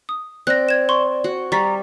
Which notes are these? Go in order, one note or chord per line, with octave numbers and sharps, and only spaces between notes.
D#6
C4 D5 F#6 A#6
G#6 E7
C6 C#6
F#4
G3 A#5 C#6 A6 B6